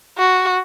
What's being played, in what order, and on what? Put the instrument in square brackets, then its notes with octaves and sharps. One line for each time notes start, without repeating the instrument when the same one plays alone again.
[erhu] F#4